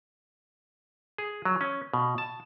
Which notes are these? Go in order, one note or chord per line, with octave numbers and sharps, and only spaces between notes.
G#4
F#3
C#4
B2
A5